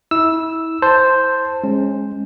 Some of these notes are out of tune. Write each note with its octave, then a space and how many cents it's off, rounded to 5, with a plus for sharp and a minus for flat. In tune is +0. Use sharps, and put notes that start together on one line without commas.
E4 -30 E6 +0
C5 +0 A5 +5
G#3 +0 C#4 -25